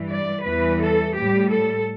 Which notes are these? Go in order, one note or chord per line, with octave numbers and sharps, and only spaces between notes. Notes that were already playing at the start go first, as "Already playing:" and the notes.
Already playing: G2 E3 G3
D5
E2 E3 G3 B4
A4
A2 G3 G4
A4